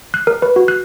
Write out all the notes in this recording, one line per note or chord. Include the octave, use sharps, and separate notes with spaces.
F#6
A#4
B4
F#4
F#6